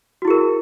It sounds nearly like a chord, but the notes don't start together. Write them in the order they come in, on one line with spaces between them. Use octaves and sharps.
F#4 E4 G#4 A#4